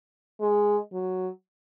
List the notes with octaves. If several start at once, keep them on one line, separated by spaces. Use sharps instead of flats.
G#3
F#3